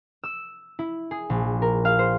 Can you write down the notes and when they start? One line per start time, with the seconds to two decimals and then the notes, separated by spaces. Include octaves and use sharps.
0.24 E6
0.79 E4
1.11 G#4
1.30 A#1
1.62 A#4
1.85 F5
1.99 C5